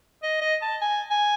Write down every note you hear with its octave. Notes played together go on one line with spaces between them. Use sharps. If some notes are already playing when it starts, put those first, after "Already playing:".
D#5
D#5
A5
G#5
G#5